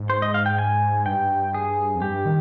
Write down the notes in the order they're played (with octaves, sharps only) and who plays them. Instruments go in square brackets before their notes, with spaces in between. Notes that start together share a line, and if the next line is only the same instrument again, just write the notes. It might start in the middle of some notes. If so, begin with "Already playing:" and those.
Already playing: [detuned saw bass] G#2
[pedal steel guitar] C5
D#5
F5
G5
G#5
[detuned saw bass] G2 [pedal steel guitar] G5
[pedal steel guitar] G#4
[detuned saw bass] F2
[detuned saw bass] G2 [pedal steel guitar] G4
[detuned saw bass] D#3